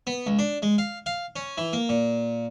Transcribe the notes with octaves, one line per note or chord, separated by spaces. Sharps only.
B3
C#2
D4
G#3
F5
F5
C#4
E3
A#3
A#2